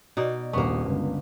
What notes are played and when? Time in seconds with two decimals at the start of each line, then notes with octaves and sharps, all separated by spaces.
0.17 B2 D#4 D5
0.53 D#1 A#1 A#3 B3 C#6
0.85 G1 C#2